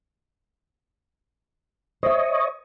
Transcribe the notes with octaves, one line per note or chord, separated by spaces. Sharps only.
C5 C#5 D#5 E5